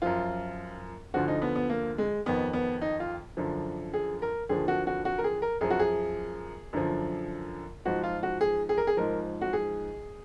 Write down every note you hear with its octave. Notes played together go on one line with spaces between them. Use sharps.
F#2 F3 F4
D2 D3 F3 F#4
D#4
B3
B3
A#3
G#3
F2 D#3 B3
B3
D#4
F4
F#2 D3 F3
G#4
A#4
D#2 D3 F3 G#4
F#4
F#4
F#4
A#4
G#4
A#4
F#2 F3 G#4
F#4
G#4
F#2 D3 F3
G#2 F3 F#4
F4
F#4
G#4
G#4
A#4
G#4
G#2 F3 A#4
F#4
G#4